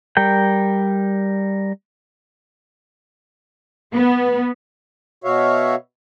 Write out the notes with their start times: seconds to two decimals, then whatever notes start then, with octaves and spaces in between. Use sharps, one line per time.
0.17 G3 A#4 G5
3.94 B3
5.24 B2 F#4 C#5 E5 F5